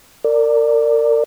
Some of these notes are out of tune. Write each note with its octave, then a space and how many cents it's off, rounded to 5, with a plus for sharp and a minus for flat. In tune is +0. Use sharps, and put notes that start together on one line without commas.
A#4 -30 D5 +0